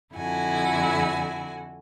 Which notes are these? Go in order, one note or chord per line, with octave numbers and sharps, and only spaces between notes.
F2 D3 E4 F#4 G#5